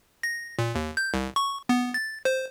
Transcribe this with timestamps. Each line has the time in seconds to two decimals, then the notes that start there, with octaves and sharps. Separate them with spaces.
0.23 A#6
0.59 A#2
0.75 D#2
0.97 G6
1.14 C2
1.36 C#6
1.69 B3
1.94 A6
2.25 C5